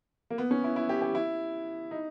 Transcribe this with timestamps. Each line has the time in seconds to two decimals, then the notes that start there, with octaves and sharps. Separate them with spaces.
0.30 A#3
0.38 B3
0.51 C#4
0.64 E4
0.76 E4
0.89 G4
1.02 G4
1.15 E4
1.91 D#4